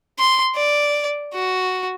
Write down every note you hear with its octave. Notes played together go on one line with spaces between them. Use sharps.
C6
D5
F#4